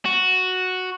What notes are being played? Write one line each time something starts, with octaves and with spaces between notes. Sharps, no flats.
F#4